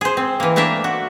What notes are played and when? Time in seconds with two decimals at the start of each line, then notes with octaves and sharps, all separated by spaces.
0.01 G#4 C5
0.17 C4
0.40 E3 A#3
0.56 A3 A#3 D4 A#4 E5
0.84 F#4